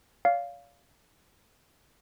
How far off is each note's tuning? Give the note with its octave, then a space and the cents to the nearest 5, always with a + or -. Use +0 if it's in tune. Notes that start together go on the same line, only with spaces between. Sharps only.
D5 -45 F5 +0